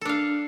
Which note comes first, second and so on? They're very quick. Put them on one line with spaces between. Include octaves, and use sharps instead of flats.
A4 D4 F5